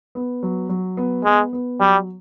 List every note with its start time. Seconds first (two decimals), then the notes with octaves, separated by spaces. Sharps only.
0.15 B3
0.43 F#3
0.69 F#3
0.97 B3
1.24 G#3 B3
1.53 B3
1.79 F#3 G3